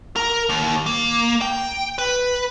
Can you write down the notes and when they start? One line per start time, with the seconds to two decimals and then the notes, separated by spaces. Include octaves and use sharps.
0.16 A#4
0.49 D#2
0.86 A#3
1.41 G5
1.98 B4